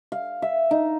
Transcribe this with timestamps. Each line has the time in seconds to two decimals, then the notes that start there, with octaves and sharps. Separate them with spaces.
0.12 F5
0.42 E5
0.71 D#4